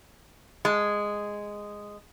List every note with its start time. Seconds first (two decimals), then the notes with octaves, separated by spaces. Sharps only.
0.65 G#3